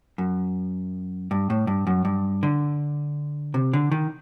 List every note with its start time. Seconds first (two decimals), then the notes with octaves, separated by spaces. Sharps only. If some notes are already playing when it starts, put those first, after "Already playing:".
0.18 F#2
1.31 G2
1.50 A2
1.67 G2
1.87 F#2
2.05 G2
2.43 D3
3.54 C3
3.73 D3
3.92 D#3